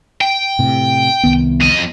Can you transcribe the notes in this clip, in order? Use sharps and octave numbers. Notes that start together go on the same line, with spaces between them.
G5
A2 C3
C2 D#3 B3
F2 D#5